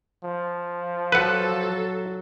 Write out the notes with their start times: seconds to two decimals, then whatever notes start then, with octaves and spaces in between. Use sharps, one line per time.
0.24 F3
1.12 F#3 A4 B4 F#5